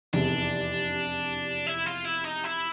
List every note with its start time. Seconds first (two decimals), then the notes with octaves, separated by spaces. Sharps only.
0.13 F1 E2 C3 D4
1.67 E4
1.86 F4
2.05 E4
2.25 D#4
2.44 E4